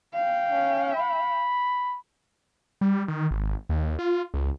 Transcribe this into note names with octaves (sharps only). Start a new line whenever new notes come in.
F5 G5
C#4
B5
G3
D#3
G#1
D#2
F4
C#2